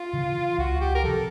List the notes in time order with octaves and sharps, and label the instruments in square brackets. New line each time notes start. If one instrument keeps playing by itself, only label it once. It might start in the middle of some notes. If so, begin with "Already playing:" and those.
Already playing: [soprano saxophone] F4
[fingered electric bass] C#3 E3
[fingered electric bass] C#2 [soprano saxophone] F#4
[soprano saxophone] G4
A#4
[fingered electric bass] C3 F3 [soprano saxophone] A4